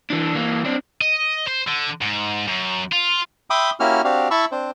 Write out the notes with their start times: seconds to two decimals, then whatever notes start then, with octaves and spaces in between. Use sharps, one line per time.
0.10 E3 D4
0.35 E3 A#3
0.65 C4 D4
1.01 D#5
1.47 C5
1.67 D3
2.01 G#2
2.48 F#2
2.93 F4
3.50 E5 G5 B5 C6 D6 D#6
3.80 A#3 C#4 E4 F#4 G4 F6
4.04 C4 D4 F#4 G4 F5
4.31 E4 A5 B5 C#6 E6
4.51 C4 D4 C5